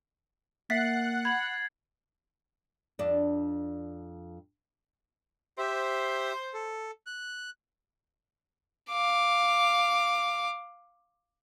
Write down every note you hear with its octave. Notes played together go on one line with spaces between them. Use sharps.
A#3 E5 F#5 F#6 A6 B6 C7
B5 G#6 F#7
F2 D4
G4 C5 E5
A4
F#6
F5 D6